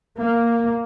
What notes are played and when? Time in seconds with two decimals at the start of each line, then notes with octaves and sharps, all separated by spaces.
0.17 A#3